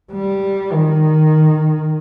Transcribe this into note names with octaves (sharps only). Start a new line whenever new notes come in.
G3
D#3